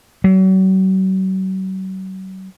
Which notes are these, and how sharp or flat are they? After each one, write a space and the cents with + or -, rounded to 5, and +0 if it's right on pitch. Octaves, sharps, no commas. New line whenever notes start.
F#3 +40